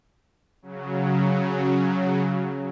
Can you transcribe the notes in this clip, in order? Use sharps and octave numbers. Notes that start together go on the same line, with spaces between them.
C#3 F#3